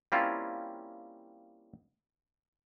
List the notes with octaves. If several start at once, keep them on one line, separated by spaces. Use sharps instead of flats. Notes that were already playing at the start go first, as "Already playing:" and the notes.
G3 A#3 C4 C#4 E4 F4